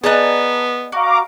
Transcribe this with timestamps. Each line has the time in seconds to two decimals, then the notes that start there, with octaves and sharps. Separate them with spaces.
0.04 B3 G#4 D5 D#5 A5 A#5 F#6
0.92 F#4 F5 A#5 D6